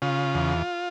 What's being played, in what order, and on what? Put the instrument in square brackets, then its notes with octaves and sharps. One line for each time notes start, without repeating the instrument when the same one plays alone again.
[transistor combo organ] C#3 F4
E2